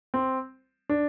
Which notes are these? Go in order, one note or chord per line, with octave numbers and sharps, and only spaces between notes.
C4
D4